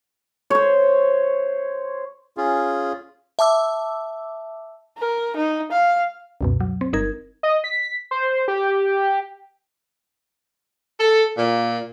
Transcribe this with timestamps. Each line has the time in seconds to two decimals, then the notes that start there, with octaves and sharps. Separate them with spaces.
0.50 C5 C#5
2.37 C#4 F4 G#4
3.39 E5 A5 D6 E6
4.98 A#4
5.36 D#4
5.72 F5
6.41 C#2 F#2 B2
6.60 F#3
6.81 C4
6.93 G1 D#4 A#4 G#6
7.43 D#5
7.64 B6
8.11 C5
8.48 G4
10.99 A4
11.37 A#2